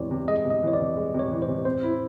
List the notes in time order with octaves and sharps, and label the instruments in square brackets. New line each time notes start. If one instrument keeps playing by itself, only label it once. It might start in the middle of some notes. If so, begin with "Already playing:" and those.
Already playing: [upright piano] C3 E3 G#3 [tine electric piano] C#5 D5
[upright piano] C3
[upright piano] G#3 [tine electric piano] D#5
[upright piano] C3
[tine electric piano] D#5
[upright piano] E3
[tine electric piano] C#5
D5
[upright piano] C3
G#3
C3
[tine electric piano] C#5
[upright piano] E3
[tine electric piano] C5
[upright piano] C3
[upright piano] C4 [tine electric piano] C5
[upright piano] E4